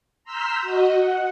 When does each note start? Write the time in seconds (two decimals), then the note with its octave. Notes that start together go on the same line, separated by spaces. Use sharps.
0.24 A#5 C6 E6 F6 G6 B6
0.62 F#4 D#5
0.95 F#5